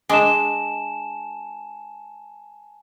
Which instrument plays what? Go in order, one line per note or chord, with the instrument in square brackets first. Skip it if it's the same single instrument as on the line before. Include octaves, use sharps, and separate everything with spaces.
[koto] G#3 D4 [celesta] G#5 A5 E7